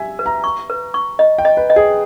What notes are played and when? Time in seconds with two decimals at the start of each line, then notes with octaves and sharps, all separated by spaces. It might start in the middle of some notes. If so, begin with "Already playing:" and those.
Already playing: G4 E5 G#5
0.19 B4
0.26 A#5
0.44 C#6
0.70 B4
0.94 C#6
1.19 D#5
1.38 G5
1.45 D#5
1.57 B4
1.70 D#5
1.76 G#4